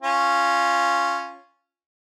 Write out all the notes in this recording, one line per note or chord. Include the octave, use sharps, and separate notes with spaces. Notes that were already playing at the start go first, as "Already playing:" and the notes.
C#4 F4